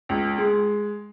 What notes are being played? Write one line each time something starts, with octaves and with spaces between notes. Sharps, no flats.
C#2
G#3